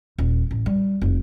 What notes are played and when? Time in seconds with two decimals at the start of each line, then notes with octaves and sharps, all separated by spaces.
0.18 D#1
0.51 A1
0.66 G3
1.01 F1